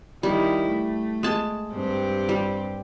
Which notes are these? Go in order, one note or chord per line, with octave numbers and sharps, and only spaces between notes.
D#3 G3 E4
A3
G#3 A5
G2 C4 G4
G3